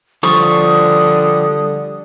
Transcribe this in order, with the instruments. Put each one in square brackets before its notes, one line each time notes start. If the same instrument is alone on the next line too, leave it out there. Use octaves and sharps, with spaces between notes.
[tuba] D3 [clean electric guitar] F3 G3 F4 [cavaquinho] C#6 [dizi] D#6